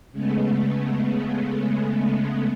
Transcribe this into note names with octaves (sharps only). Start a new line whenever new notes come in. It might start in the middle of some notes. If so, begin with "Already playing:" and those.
C#3 G#3 A3 B3